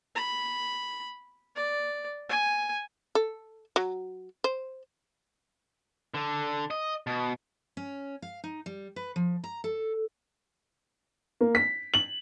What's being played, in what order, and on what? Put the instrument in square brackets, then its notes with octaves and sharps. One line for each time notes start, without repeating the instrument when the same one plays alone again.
[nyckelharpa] B5
D5
G#5
[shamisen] A4
F#3
C5
[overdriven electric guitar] D3
D#5
B2
[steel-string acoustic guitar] C#4
F5
D#4
G3
B4
F3
A#5
A4
[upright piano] A#3
B6
F#7